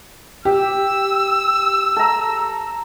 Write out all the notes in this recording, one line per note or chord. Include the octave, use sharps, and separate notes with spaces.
G4 E6
A4 A#5